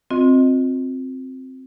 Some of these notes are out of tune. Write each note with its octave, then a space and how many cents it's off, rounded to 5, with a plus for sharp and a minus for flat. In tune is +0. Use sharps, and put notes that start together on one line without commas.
C4 +0 F4 +35 D#5 +0